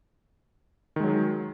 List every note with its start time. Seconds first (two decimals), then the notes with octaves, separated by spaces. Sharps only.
0.96 D#3
1.00 G#3
1.04 F#3